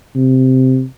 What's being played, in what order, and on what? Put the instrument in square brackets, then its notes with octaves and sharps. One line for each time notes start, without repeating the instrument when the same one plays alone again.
[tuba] C3